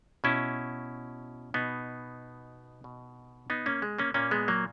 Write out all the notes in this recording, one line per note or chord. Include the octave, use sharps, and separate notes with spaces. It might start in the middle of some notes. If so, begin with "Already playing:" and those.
B2 C#4 E4
B2 B3 D#4
B2
B3 D#4
A#3 C#4
G#3
A#3 C#4
A#2 A#3 C#4
G#3 B3
F#3 A#3